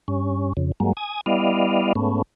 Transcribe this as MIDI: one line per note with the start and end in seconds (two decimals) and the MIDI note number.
0.08 0.53 43
0.08 0.53 61
0.57 0.72 41
0.57 0.72 49
0.80 0.93 43
0.80 0.93 54
0.80 0.93 56
0.80 0.93 58
0.97 1.21 80
0.97 1.21 87
1.26 1.93 55
1.26 1.93 59
1.26 1.93 64
1.26 1.93 74
1.26 1.93 75
1.26 1.93 77
1.95 2.22 44
1.95 2.22 57
1.95 2.22 59
1.95 2.22 61